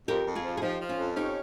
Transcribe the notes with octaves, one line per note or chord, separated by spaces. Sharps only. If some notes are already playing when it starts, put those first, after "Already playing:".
F2 G4 A#4
F2
F4 G#4
F3
G#4
F3 D#4 G4
F3
C#4 F4
F2
C#4 D#4 G4